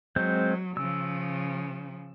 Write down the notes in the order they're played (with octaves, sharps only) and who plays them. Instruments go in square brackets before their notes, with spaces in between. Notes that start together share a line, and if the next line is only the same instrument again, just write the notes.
[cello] F#3 [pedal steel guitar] G#3 C4 G6
[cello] C#3 F3 [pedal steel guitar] E6